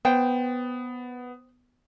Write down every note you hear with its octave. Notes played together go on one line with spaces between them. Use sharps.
B3 C5 G5